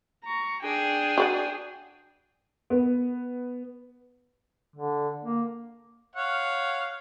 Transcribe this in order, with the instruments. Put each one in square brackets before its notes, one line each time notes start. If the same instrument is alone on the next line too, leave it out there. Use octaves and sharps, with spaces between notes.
[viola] A#5 C#6
[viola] D4 G5 [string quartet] G#4
[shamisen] F#4 D5 F#5
[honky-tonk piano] B3
[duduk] D3
A#3
[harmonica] C#5 F5 F#5